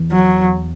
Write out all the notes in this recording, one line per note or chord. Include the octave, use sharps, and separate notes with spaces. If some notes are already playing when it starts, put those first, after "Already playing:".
Already playing: E2
F#3